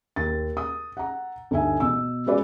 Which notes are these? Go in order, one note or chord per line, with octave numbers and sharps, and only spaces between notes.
D#2 A6
D#6
F#5 A#5
G1 D2 D#4 E5 G#5
B2 E6
G#3 C#4 F#4 B4 D5